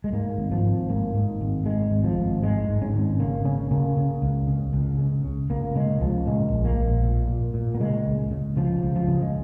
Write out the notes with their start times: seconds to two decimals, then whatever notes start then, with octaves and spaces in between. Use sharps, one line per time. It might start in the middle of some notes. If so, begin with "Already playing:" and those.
0.04 G#3
0.12 G#2 A#3
0.38 G#1
0.52 F3
0.64 G#1
0.89 G#2 A#3
1.15 G#2
1.41 G#1
1.66 G#2 G#3
1.91 G#1
2.04 F3
2.18 G#1
2.42 G#2 G#3
2.69 G#2
2.82 C#4
2.94 G#1
3.20 C#3 A#3
3.45 C#3 C#4
3.71 C#3 A#3
3.97 C#3
4.22 C#2
4.48 C#3
4.73 C#2
4.98 C#3
5.24 C#3
5.50 C#2 A#3
5.75 C#3 G#3
6.01 C#2 F3
6.26 A#2 G#3
6.52 A#1
6.65 A#3
6.78 A#1
7.03 A#2
7.28 A#2
7.54 A#2
7.75 A#3
7.80 C#3 G#3
8.06 C#2
8.31 C#3
8.57 C#3 F3
8.83 C#2
8.96 F3
9.08 C#3
9.22 G#3